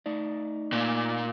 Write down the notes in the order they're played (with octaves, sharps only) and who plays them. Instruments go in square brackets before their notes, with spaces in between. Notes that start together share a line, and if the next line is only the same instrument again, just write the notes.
[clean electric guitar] A3 D#4 D5
[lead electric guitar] A#2